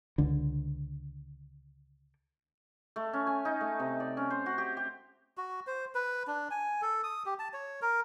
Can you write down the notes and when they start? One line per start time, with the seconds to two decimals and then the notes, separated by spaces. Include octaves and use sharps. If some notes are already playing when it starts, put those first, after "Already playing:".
0.18 C#2 D3
2.96 A3
3.13 C#4
3.27 G#5
3.45 D#4
3.61 A3
3.79 C3
4.00 D5
4.17 C#4
4.30 C5
4.46 F#4
4.58 G4
4.77 G4
5.37 F#4
5.67 C5
5.95 B4
6.27 D4
6.51 G#5
6.82 A4
7.04 D#6
7.26 G4
7.39 A5
7.53 C#5
7.82 A#4